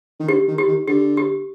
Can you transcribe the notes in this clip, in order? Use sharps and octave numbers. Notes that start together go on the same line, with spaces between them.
D#3
D3 G4
D#3
G4
D#3
D3 G4
G4